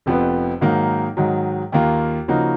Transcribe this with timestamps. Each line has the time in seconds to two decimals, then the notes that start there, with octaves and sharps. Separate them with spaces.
0.06 F1 F2 F3 B3
0.61 G#2 D#3 F#3 A#3 D#4
1.17 G#2 D#3 F#3
1.72 D#2 D#3 A#3 F4
2.28 C#3 F3 A#3 D#4 F#4